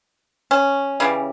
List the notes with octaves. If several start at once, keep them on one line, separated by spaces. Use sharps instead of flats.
C#4
C#3 E3 G3